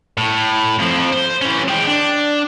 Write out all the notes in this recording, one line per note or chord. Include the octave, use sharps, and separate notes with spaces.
A2
F2 F3
C5
E3 C#4
G#3 G5
D4